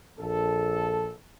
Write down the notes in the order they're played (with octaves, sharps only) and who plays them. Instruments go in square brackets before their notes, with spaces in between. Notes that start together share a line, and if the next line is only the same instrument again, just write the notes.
[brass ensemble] A#1 A4